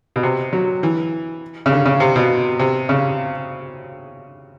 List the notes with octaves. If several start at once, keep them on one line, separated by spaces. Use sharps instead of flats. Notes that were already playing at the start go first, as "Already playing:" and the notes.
B2
C3
F#3
E3
C#3
D3
C#3
C3
B2
C3
C#3